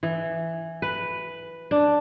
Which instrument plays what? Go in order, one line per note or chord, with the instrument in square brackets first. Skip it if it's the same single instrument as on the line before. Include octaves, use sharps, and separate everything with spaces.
[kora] E3
B4
D4